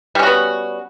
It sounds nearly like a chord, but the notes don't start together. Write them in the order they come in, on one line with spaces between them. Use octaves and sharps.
G3 C#4 F#4 B3